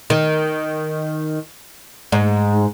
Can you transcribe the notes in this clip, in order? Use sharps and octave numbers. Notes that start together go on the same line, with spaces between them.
D#3
G#2